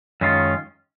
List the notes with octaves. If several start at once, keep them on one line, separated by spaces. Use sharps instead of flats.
F#2 D#3 G#3 C#4 F4